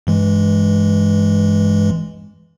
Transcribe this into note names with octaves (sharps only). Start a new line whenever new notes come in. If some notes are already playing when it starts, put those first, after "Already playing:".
G2 E3 G#3